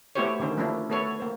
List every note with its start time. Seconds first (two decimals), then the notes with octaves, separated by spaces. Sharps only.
0.15 A3 B3 E4 G4 C5 C#5
0.40 D3 D#3 C#4 C5
0.57 F3 A3 A#3 C#4 D4 E4
0.90 A3 B3 A4 B4 C#5
1.20 A#3 C5